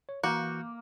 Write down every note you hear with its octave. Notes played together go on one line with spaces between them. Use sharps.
C#5
E3 A#3 F#4 F#6 G6